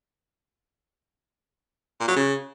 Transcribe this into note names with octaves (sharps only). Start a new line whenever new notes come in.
A#2
F#3
C#3